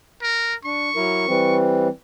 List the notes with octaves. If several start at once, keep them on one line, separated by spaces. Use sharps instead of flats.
A#4
D4 C#6
F#3 E4 A#4
E3 G3 C4